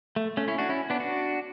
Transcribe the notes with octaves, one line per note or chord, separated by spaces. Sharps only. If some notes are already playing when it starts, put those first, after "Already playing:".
A3
A3 C#4
C#4 E4
D4 F#4
C#4 E4
B3 D4
D4 F#4